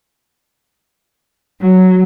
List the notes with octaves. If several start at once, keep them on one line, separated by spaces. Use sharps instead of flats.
F#3